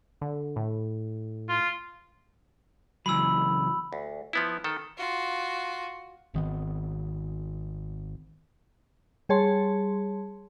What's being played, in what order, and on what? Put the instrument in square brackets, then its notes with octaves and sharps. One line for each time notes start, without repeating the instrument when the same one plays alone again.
[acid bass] D3
A2
[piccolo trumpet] F4
[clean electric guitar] C#2 E3 F#3 [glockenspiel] B5 E6
[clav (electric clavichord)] D2
F3 B3 E4
D#3 A4
[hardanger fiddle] F4 F#4
[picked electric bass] G#1 D#3 B3
[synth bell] G3 G#4 C#5 A5 C6